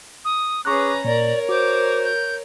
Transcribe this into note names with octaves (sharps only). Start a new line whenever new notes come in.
D#6
C#4 G#4 B4 A#5 C#6 D6 F#6
A#2 A#4 C#5 D5
F#4 C5 D6
G6